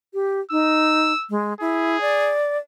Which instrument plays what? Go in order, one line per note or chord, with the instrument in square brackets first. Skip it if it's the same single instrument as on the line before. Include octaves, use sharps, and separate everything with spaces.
[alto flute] G4
[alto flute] D#4 [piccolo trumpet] E6
[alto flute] G#3
[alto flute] E4 [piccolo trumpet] G#4
[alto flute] D5